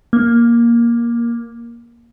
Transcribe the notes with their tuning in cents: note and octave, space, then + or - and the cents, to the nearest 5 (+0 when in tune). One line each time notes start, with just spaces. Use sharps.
A#3 +10